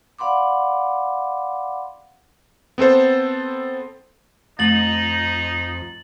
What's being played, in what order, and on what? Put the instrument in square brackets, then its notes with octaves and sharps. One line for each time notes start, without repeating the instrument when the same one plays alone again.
[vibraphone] D5 F5 F#5 B5 C6 D6
[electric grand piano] B3 C4 A4 C5
[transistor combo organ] F2 [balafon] A3 [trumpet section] D#4 [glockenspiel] A6 F#7